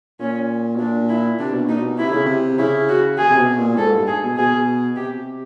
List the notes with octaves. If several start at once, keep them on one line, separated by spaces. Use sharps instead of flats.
A#2 C#4
B2
A#2 D4
E4
C3 D4
B2
A#2 D#4
B2
C3 E4
C#3
C3
C#3 E4
F#4
G#4
C3
B2
A#2
G#2 A4
G2
G#4
B2
B2 G#4
C3 G4